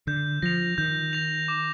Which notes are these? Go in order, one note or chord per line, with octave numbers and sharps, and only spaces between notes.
D3 G6
F3 A#6 F7
D#3 G6
A#6 F7
D6